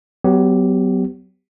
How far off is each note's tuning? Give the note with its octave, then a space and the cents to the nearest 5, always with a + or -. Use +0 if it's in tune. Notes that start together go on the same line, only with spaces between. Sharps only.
F#3 +25 B3 +25 G4 +0